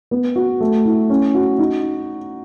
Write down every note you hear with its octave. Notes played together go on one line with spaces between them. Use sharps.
B3
F#4
A3
E4
C#4
F#4
D#4